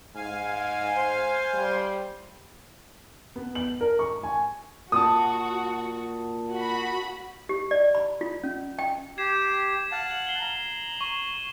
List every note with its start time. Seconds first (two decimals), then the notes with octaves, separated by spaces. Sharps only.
0.15 G#2 F5 G#5
0.95 C5
1.53 G3
3.36 B3
3.55 F#7
3.81 A#4
3.99 C#6
4.23 G#5
4.92 A#2 F#4 A5 D#6
6.53 F#4 B5
7.49 G4
7.71 D5
7.95 B5
8.21 F4
8.44 C#4
8.79 G5
9.18 G4 G#6 C7 E7
9.92 F5 F#5 A5
10.11 F#7
10.27 C7 G7
10.40 A#5
11.01 C#6 E7